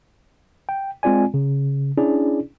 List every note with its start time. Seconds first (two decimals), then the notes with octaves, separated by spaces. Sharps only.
0.69 G5
1.03 G#3 C4 F4 D5 G#5
1.34 C#3
1.97 C#4 D4 E4 G#4 D5